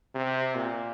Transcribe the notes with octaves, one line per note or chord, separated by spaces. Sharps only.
C3
A#2